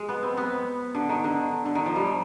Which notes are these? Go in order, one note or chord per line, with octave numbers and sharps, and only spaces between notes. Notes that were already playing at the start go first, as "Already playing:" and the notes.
Already playing: G#3
B3
C4
B3
D3
D#3
D3
D3
D#3
F3
G3